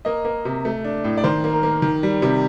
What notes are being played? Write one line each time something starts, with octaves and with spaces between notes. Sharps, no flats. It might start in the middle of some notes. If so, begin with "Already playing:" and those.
A#3 D#5
A#3
C3
A3
D4
A2
D5
D#3 C5
A#3
A#4
A#3
D#3
G3
C3